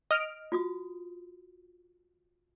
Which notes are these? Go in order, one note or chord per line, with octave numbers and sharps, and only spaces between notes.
D#5 F6 D7
F4 F#4 D#6